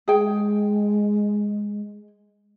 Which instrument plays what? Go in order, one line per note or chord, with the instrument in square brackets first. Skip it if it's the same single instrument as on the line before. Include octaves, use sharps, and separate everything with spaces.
[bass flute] G#3 [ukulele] G#4 G5